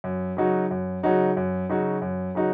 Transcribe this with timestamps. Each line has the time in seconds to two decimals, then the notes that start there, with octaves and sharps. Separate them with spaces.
0.04 F#2
0.37 C#3 F#3 D#4 F#4
0.71 F#2
1.03 C#3 F#3 D#4 F#4
1.37 F#2
1.69 C#3 F#3 D#4 F#4
2.02 F#2
2.35 C#3 F#3 D#4 F#4